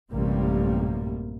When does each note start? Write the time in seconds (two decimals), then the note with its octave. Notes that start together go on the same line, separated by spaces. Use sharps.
0.11 A1 F#2 C3 G3 A#3